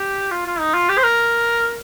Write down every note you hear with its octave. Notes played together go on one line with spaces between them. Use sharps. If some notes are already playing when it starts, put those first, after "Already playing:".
Already playing: G4
F4
F4
D#4
F4
G4
C5
A#4